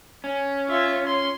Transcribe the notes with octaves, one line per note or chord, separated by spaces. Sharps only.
C#4
F4 E5
C6